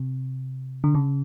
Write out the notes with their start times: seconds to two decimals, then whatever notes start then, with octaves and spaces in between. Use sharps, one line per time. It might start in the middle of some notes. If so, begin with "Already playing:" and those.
Already playing: C3
0.84 D3
0.95 C#3